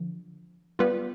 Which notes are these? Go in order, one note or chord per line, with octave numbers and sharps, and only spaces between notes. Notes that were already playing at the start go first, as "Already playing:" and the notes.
Already playing: D3 F3
G3 B3 F4 B4